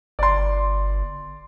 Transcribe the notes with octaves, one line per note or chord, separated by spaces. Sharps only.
G1 D5 C6